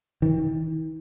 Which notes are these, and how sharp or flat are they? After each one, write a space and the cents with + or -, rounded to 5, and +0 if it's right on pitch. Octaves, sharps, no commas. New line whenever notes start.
D#3 +45